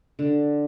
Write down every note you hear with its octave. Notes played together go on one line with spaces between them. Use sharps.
D3